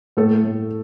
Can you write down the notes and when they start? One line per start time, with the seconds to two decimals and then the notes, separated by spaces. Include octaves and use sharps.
0.17 A2 A3 A4
0.44 A2